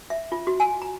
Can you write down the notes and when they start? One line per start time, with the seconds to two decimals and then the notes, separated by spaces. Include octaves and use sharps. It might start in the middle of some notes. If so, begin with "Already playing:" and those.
0.10 E5
0.32 F4
0.47 F#4
0.60 G#5
0.82 A#5